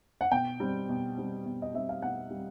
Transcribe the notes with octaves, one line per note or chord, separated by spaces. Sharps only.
F#5
B2 G5
G3 C4
B2
G3 C4
B2
D#5
G3 C4 E5
F5
B2 F#5
G3 C4